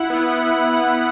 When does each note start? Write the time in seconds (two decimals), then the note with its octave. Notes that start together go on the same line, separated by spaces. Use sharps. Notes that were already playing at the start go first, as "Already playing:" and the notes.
Already playing: E4 F#5
0.10 B3
0.41 B3 F#5
0.73 B3